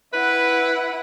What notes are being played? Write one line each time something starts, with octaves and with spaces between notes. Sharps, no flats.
E4 B4 F#5